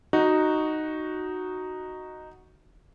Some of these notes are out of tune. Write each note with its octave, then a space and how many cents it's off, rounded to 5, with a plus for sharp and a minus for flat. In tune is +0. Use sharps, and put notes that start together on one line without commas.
D#4 -5 F#4 +0